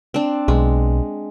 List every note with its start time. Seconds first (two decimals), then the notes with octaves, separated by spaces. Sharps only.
0.14 C4 D4
0.48 B1 G#3